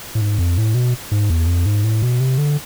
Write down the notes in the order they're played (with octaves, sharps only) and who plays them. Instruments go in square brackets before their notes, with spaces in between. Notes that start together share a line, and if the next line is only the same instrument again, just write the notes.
[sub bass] A2
G#2
F2
A2
B2
G#2
E2
F2
G#2
A2
B2
C3
D3